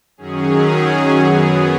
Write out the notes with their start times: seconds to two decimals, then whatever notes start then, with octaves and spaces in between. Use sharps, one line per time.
0.18 F#2 D#3 F#3 C#4 G#4
1.19 F#2 F#3 B3